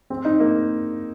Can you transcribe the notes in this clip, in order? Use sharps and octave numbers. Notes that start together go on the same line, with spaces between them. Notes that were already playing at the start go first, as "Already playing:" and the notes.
C4
D#4
A#3